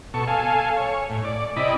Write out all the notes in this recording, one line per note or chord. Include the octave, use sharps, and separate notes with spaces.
B2 A4 C#6
A4 F5 G#5
C#5
A2
D5
C3 E4 D5 D#5 B5